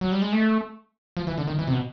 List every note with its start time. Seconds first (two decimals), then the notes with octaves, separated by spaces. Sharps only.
0.01 F#3
0.12 G3
0.22 G#3
0.32 A3
1.17 F3
1.27 E3
1.38 D3
1.47 D#3
1.59 E3
1.67 C3
1.73 B2